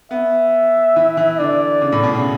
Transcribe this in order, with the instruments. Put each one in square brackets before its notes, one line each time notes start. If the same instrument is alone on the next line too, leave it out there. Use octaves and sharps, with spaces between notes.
[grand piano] B3 [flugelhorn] E5
[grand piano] E3
E3
[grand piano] D3 [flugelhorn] D5
[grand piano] C#3
A2
B2
C#3